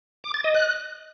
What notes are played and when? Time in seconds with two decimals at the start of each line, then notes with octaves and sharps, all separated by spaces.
0.24 D6
0.34 A6
0.44 D#5
0.55 F#6